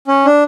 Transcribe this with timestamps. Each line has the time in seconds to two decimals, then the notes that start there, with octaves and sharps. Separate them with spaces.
0.08 C#4
0.25 D4